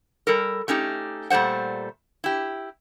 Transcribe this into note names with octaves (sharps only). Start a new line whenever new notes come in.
G3 A4 A#4
A3 C#4 D#4 G4
A#2 G3 A3 C5 F#5
E4 G4